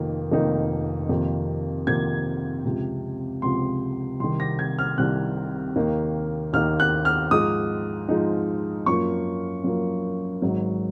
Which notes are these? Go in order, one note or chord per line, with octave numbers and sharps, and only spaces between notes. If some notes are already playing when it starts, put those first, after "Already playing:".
Already playing: F1 F2 D#3 A#3 D#4
F1 F2 D#3 A#3 D#4
F2 C3 D#3 A#3
F2 C3 D#3 A#3 G#6
C#2 C3 F3
C#2 C3 F3 C6
C2 C3 D#3 C6
A#6
G#6
F6
C2 C3 D#3 F#6
D#2 D#3 A#3 D#4
D#2 D#3 A#3 D#4 F6
F#6
F6
G#2 F3 G#3 D#4 D#6
G#2 F3 G#3 D#4
F#2 F3 A#3 C#6
F#2 F3 A#3
G#1 G#2 F#3